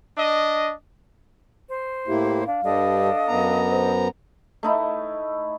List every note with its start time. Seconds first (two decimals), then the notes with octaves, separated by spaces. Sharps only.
0.18 D4 D#5
1.68 C5
2.08 A2 A#3 E4 G4
2.46 D4 F5
2.63 G2 G3 D4 A4 D#5
3.28 F#2 B3 A#5
3.71 C5
4.63 A3 D#4 E4